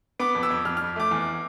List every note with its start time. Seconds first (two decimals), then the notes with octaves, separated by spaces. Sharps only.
0.20 B3 D6
0.35 F2
0.43 E6
0.51 F2
0.65 F2 F6
0.77 F2 F6
0.96 A3 D6
1.11 E2